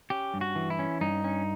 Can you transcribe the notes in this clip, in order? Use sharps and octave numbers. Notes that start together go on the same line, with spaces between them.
C#4 G4
G2
F#4
E3
E4
C#4
G2 D#4
C#4